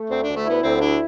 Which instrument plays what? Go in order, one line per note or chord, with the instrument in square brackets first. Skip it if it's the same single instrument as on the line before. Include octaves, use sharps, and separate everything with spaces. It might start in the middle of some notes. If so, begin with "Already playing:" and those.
Already playing: [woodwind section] A3
[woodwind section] D2 [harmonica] C4
[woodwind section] D2 [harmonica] D4
[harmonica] A3
[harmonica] B3 [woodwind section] E4
[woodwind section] D2 [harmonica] C4
[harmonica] D4 [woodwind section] E4